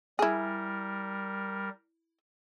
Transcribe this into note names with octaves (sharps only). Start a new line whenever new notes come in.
G3 E4 G#4 A#4